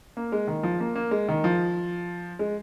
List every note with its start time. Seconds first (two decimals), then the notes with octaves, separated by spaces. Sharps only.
0.17 A#3
0.32 G#3
0.47 D#3
0.63 F3
0.80 A#3
0.95 A#3
1.11 G#3
1.28 D#3
1.44 F3
2.39 G#3